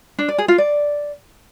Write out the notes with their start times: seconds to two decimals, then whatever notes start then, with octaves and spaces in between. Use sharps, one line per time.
0.19 D4
0.28 D5
0.38 G#4
0.48 F4
0.58 D5